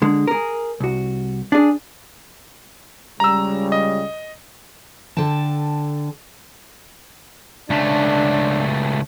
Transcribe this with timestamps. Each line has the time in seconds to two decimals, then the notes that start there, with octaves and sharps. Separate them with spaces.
0.02 D3 G#3
0.27 G#4 A#4
0.80 C2 F#4
1.52 D4 G#4
3.20 C#2 C#3 G3 A#5 E6
3.72 D#5
5.17 D3 A4 G5 A5
7.70 C#2 A3 D4